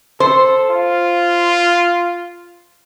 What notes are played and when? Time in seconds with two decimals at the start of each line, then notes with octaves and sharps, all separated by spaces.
0.20 A4 C5
0.70 F4